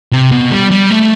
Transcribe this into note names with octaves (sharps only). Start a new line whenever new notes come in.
C3
B2
G3
G3
A3